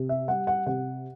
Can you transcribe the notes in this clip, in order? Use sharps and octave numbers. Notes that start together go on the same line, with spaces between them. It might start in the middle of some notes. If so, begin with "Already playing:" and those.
Already playing: C3
E5
G3 F#5
F#5
C3 F#5